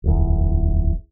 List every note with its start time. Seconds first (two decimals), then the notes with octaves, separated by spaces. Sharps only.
0.04 D1 G1 E2